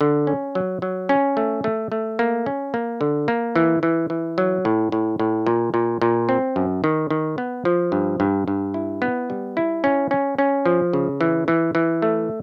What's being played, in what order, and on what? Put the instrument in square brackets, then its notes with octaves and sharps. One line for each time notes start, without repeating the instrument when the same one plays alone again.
[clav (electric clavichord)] D3
C#4
F#3
F#3
C#4
A3
A3
A3
A#3
C#4
A#3
D3
A#3
E3
E3
E3
F#3
A2
A2
A2
A#2
A#2
A#2
C4
F#2
D#3
D#3
B3
F3
G2
G2
G2
E4
B3
G3
E4
C#4
C#4
C#4
F3
C#3
E3
E3
E3
A3